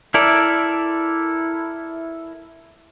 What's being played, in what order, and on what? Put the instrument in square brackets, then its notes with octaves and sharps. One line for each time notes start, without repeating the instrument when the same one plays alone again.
[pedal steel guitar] E4 A4 A#4 D5